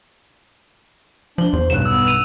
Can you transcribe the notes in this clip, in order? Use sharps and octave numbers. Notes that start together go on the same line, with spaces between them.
F3 D4 F#7 G7
E2 C5
B1 G2 F#3 F#6 E7
B3 E6
D#7 F7